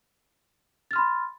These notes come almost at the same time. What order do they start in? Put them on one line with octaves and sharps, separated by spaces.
A6 F6 C6 B5